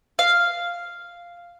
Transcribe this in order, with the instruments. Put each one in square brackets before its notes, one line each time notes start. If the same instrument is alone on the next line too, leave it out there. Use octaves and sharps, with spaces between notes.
[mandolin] F5